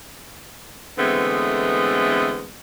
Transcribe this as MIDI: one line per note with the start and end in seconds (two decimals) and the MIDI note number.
0.98 2.53 50
0.98 2.53 52
0.98 2.53 56
0.98 2.53 57
0.98 2.53 59
0.98 2.53 60